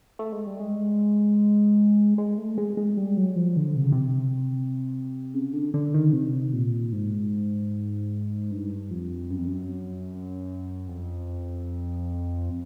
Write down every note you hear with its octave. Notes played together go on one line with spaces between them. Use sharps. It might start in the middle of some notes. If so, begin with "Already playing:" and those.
A3
G#3
G3
G#3
G#3
A3
G#3
G#3
G3
F#3
F3
D3
C3
C#3
C3
C#3
D3
D3
D#3
C3
A#2
G#2
G2
F2
F#2
F2
F#2
F2